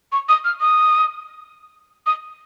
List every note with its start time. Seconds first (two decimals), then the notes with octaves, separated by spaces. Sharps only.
0.12 C#6
0.29 D#6
0.45 F6
0.61 D#6
2.06 D#6